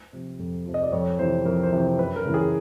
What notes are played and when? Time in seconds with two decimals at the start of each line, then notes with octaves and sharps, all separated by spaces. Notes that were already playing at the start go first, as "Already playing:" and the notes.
Already playing: C5
0.13 C3 F3
0.39 F2
0.66 C3 F3
0.74 D#5
0.83 D5
0.92 F2 C#5
1.19 C3 E3 C5
1.45 F2 A#4
1.63 C5
1.72 C3 E3
1.81 C5
1.99 F#2 B4
2.16 A#4
2.26 C#3 E3
2.34 G#4